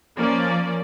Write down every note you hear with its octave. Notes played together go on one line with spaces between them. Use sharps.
F3 A#3 C#4 D5